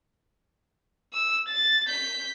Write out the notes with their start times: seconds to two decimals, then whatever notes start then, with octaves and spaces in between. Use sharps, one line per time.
1.13 E6
1.48 A6
1.88 G6 B6